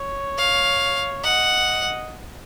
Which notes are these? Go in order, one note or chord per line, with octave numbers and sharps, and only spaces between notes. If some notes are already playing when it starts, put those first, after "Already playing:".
Already playing: C#5
F5
D#5 F#5